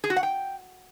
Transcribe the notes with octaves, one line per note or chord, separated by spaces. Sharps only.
G#4
F#4
F#5
G5